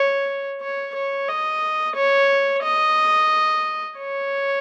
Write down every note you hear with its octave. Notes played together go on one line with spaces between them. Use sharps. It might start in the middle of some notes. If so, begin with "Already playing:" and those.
Already playing: C#5
C#5
C#5
D#5
C#5
D#5
C#5